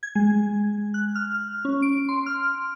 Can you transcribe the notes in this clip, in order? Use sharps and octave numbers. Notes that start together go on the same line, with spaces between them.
G#6
G#3
F#6
F6
C#4
D7
C6
F6